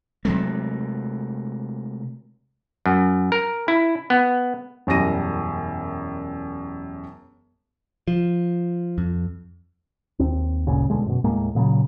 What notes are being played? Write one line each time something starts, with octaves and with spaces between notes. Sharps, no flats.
C3 F#3 G#3 A3
F#2
A#4
E4
B3
E1 F#2 G3 A#6 D#7
F3
F2
D#2 C4
G1 D2 A#2 C#3
E2 B2 D3 G#3
F#2 B2
D#2 A2 G#3 A#3
A#2 C#3 F3 F#3